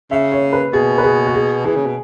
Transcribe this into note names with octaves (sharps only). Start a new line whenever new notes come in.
C#3 E5
C#5
B4
B2 G#4
B4
G#4
F#4
G#4
E3 G#4
C#3
B2